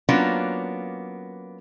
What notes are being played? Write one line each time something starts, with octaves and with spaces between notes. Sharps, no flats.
F#3 A#3 B3 C#4 D4 F4